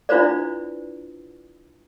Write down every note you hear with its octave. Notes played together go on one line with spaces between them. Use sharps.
D4 E4 F4 B4 C5 D5